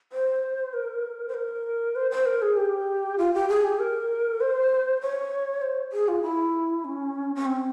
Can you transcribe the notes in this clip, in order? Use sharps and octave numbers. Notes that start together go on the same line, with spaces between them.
C5
A#4
C5
A#4
C5
C5
A#4
G#4
G4
F4
G4
G#4
G4
A#4
C5
C#5
C5
G#4
F4
E4
C#4
C#4
C4